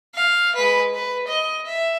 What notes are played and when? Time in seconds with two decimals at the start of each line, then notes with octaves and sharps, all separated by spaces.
0.14 F5
0.55 G#3 B4
0.94 B4
1.27 D#5
1.66 E5